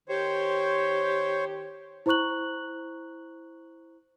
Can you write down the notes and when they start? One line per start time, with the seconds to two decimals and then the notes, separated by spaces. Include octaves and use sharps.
0.09 D#3 G4 C5 C#5
2.06 E4 C5 A#5 C#6 F#6 F#7